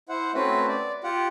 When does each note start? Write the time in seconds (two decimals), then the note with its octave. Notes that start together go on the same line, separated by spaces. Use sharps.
0.09 E4 C5 F#5
0.35 A3 C4 C#4 F#4 B4
0.67 D5
1.04 F4 G4 F#5